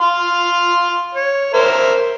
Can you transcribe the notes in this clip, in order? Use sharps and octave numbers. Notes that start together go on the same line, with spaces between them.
F5 C6
C#5
A#4 C5 E5